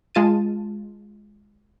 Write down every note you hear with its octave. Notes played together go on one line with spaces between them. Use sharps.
G#3 F4 A5 D#7